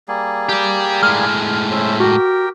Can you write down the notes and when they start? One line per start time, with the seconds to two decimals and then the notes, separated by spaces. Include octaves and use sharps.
0.08 G3 A#3 G#4
0.49 G4 D5
1.03 A2 G#3 F6
1.71 C#4 C5 E5
2.00 F#4 G4 A#4 G5